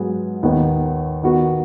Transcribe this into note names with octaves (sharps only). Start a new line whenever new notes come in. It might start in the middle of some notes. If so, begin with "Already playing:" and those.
Already playing: G#2 F#3 B3 G#4
D#2 D#3 B3
D#3 B3 F#4